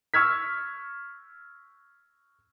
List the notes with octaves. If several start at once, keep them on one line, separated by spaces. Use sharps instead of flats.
C#6 E6 F6 G#6 B6